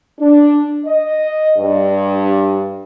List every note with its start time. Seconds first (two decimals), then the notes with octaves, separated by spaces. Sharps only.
0.19 D4
0.86 D#5
1.57 G2